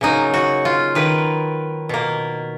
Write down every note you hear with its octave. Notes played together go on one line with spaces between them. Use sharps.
C#3 F#3 A#3 D#4
F#4
F4
D#3 A#3 B4
B2 A#3